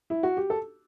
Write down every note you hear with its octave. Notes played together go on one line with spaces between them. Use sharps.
E4
F#4
G4
A4